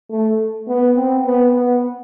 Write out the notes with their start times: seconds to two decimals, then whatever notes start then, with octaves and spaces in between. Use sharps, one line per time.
0.10 A3
0.68 B3
0.96 C4
1.26 B3
1.54 B3